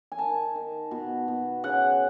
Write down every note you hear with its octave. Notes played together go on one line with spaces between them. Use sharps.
G#5
D#3 A5
D#3
B2
B2
C#3 F#5